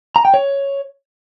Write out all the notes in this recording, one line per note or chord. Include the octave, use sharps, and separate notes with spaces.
A#5
G5
C#5